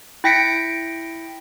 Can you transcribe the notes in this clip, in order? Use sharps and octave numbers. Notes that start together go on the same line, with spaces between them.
E4 G5 A#6 B6 C#7 D7